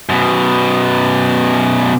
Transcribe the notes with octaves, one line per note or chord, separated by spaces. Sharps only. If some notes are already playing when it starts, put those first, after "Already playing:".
F#2 B2